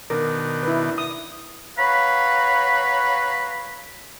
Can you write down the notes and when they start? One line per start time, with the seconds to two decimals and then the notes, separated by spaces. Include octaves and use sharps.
0.10 B2 D#3 D4 A#4
0.63 E4 B4
0.98 D#6
1.78 B4 C#5 F5 F#5 A#5 B5